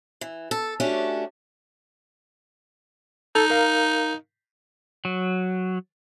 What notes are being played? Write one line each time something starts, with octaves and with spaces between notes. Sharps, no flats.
E3
A4
A3 C#4 D4 F#4 G4
D#4 A4
A#4 F5
F#3